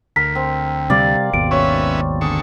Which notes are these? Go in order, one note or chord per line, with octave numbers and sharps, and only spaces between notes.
D2 A#4 B6
C4
C3 G3 D5 F5
G#1 D#2 B2 D7
C#4 B4 C#5 E5 C#6
D3 G#4 A4 C#6